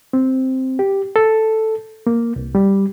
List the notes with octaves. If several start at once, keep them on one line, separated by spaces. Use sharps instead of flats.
C4
G4
A4
A#3
C2
G3